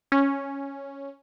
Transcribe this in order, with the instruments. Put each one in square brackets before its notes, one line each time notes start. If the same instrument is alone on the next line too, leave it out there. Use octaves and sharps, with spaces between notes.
[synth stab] C#4